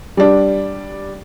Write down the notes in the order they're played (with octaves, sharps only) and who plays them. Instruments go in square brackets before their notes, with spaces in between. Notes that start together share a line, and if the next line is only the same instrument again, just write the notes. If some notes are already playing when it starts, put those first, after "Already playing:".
[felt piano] G3 D4